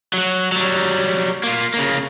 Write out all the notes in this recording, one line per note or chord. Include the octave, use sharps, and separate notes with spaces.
F#3 F#4
F#3 G3
A#3 F4
C#3 A#3